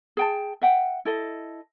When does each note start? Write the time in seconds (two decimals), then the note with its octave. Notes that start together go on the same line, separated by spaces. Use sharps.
0.17 G#4 G5 A5
0.62 E5 F#5 G5
1.05 E4 A4 D#5